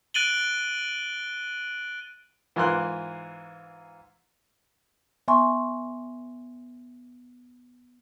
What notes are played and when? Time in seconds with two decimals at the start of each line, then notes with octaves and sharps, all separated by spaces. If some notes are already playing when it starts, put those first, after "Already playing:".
0.14 F#6 A6 D7 D#7 F#7 G7
2.56 G#2 E3 F4 A#4 C6 F#6
5.28 B3 E5 G#5 C6 C#6